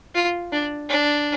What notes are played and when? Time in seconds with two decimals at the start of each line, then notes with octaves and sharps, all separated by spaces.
0.15 F4
0.52 D4
0.89 D4